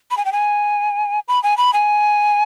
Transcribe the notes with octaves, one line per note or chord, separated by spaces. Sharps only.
B5
G#5
G5
G#5
B5
G#5
B5
G#5